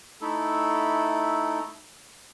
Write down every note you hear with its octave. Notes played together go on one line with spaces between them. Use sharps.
A3 D#4 E4 A4